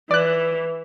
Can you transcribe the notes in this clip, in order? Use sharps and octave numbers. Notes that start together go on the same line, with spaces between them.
E3 D5 F#6